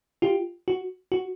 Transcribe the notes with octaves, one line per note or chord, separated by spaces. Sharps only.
F4 G4
F#4
F#4